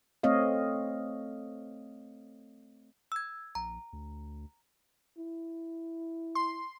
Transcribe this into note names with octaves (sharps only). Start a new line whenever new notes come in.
A3 C4 C#5 D#5 F5
E6 G#6
A#1 A#5
D2
E4
C6